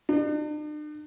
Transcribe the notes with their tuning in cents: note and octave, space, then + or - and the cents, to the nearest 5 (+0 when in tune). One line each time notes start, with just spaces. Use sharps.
D4 +45